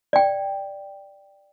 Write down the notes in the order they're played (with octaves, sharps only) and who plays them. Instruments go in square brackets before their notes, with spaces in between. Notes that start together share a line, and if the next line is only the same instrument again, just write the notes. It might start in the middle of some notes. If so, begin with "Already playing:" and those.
[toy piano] D5 G5